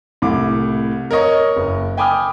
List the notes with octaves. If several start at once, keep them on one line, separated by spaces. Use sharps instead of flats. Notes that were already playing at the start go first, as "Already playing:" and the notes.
C2 A2 D6
A#4 C#5 D#5 C#6
F#1
G5 G#5 B5 D6 D#6 F6